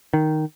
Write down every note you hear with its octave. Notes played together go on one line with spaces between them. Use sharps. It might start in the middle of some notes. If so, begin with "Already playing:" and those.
D#3